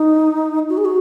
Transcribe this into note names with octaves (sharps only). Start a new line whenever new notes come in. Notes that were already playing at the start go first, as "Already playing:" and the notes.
Already playing: D#4
F#4
G#4
F#4